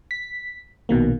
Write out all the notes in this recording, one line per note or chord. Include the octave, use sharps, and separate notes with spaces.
B6
A#1 B2 D#3 A#3